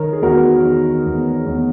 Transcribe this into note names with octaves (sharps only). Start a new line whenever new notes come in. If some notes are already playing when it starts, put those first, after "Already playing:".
Already playing: D#3 A#4 C#5
G#4
E2 F#4 A#4
D#3
E2
E2